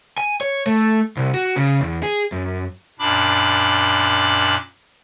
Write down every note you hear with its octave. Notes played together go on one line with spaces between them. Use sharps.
G#5
C#5
A3
C2
F#4
C#3
E2
G#4
F#2
F#2 A#2 D4 B5 D6